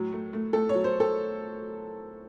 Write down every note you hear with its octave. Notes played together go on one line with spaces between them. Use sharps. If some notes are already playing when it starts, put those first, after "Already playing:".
Already playing: A2 F#3
A3
A3
A3 A4
C#5
F#3
C5
A4